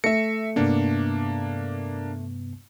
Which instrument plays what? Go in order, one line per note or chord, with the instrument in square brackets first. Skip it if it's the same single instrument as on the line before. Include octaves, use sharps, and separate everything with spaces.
[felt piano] A3 [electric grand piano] E5 C#7 [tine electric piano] A#6
[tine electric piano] G2 C3 B3 [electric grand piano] A#3 D4